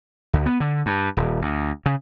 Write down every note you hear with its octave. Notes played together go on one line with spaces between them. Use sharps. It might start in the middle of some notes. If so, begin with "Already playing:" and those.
D2
B3
D3
G2
D#1
D2
C#3